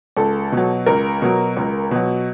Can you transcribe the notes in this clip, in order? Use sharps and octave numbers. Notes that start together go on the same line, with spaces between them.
C#2 A4
B2 F#3
C#2 A#4
B2 F#3
C#2
B2 F#3